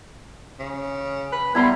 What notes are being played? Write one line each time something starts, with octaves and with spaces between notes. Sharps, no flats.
C#3
B4
G3 B3 E4 A#5 C6